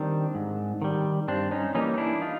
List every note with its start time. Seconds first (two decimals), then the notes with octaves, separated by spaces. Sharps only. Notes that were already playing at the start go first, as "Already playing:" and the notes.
Already playing: D#3 G3 C4 D4
0.35 G#2
0.82 D#3 G3
1.28 G2 C4 D4
1.51 C#4 D#4
1.74 E3 G3 A#3 C#4 D#4
1.94 D#4
1.98 D4 E4
2.21 D#4 F4